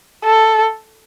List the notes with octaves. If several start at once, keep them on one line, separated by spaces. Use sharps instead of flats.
A4